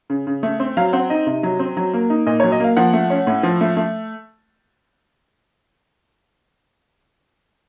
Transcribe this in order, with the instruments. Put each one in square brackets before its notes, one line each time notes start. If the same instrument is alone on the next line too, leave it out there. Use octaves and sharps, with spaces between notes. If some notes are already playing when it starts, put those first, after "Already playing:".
[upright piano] C#3
C#3
A3
C4
F#3 F5
C4 F#5
D#4 D#5
C3
F#3
C4
F#3
A#3
D#4
A#2 D#5
F#3 C#5
D#5
A#3 F5
F3 F#5
A3
C#4
A2
F3
A3
A3